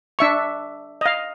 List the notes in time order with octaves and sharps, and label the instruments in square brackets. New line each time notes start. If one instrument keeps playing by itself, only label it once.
[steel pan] D4 E5 C#6
D#5 F5